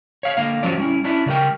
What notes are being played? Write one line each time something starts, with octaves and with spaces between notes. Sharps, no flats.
C#5 F5
D3 A#3 F5
F3 F#3 C#4 D5
G3 C#4 E4
C#4 D4 E4
C#3 G3 A#4 G5